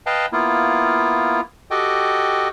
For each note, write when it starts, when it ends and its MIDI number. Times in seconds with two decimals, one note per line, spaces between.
0.06 0.26 71
0.06 0.26 75
0.06 0.26 77
0.06 0.26 79
0.06 0.26 81
0.33 1.41 58
0.33 1.41 59
0.33 1.41 64
0.33 1.41 65
1.71 2.48 66
1.71 2.48 67
1.71 2.48 69
1.71 2.48 75
1.71 2.48 79